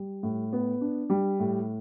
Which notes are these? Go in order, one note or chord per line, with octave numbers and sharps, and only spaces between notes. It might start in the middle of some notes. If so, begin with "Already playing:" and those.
Already playing: G3
A2
B3
D4
G3
A2